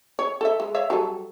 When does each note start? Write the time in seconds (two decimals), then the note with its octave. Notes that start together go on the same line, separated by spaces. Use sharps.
0.19 C#5
0.41 A4 E5
0.60 G#3
0.75 C#5 E5 F5
0.90 F#3 G3 A4